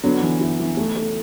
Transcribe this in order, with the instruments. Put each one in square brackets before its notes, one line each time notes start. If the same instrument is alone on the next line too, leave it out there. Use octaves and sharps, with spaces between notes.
[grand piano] D3 F#3 [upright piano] B3
[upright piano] E3
E4
E3
A3
A3